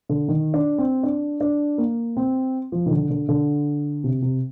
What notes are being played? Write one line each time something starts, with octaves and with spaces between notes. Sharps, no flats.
D3
D#3
D4
C4
D4
D4
A#3
C4
F3
D#3
D3
D3
D3
C3
C3